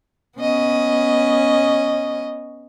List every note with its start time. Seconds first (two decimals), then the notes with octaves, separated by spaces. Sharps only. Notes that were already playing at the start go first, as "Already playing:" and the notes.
0.39 B3 C#4 D#5